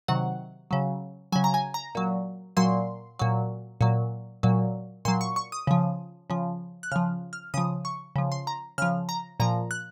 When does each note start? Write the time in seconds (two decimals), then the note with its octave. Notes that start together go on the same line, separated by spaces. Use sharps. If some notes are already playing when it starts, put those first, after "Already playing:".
0.08 C3 D#3 F#3 F#5
0.71 C#3 F#3
1.32 F#3 G#5
1.36 C#3
1.44 A#5
1.54 G#5
1.74 A#5
1.95 A#2 F#3
2.57 A#2 F#3 C6
3.19 A#2 F#3
3.81 A#2 F#3
4.43 A#2 F#3
5.05 A#2 F#3 C6
5.21 C#6
5.36 C#6
5.52 D#6
5.67 C#3 F3
6.30 C#3 F3
6.83 F#6
6.92 C#3 F3 F6
7.33 F6
7.54 C#3 F3 D#6
7.85 C#6
8.16 C#3 F3
8.32 C6
8.47 A#5
8.78 C#3 F3 F6
9.09 A#5
9.40 A#2 F3 A#5
9.71 F#6